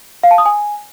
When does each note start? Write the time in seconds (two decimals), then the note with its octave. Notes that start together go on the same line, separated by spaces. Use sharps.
0.23 F5
0.31 A5
0.38 D#6
0.46 G#5